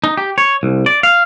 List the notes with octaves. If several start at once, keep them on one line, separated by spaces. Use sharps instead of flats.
D#4
G4
C#5
C2
D5
F5